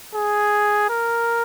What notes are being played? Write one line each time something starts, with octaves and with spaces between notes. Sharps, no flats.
G#4
A#4